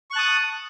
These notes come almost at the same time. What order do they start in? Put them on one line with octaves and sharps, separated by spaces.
C#6 F#6 A5 D#6